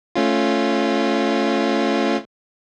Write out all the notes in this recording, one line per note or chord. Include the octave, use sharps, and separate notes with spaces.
A3 C#4 F4